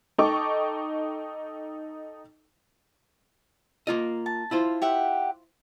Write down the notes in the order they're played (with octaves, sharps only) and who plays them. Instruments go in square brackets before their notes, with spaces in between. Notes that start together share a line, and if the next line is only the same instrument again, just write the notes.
[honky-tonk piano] D#4 A4 G5 C#6 D6
[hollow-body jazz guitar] A#3 F4 D#5
[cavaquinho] A5
[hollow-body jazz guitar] E4 F4 C5
[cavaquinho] G4 E5 F#5